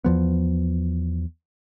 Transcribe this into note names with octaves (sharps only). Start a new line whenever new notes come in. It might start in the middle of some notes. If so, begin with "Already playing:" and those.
E2 F3 B3